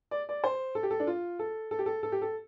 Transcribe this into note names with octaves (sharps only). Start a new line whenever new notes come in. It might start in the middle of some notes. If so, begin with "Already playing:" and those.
D5
D5
C5
A4
G4
A4
D4
F4
A4
A4
G4
A4
A4
G4
A4